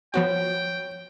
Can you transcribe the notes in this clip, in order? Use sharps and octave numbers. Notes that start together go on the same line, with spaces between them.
F3 B3 F#4 C#5 G5